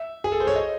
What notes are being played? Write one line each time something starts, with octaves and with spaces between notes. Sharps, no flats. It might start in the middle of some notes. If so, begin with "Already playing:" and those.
Already playing: E5
G#4
A4
C5
C#5
D#5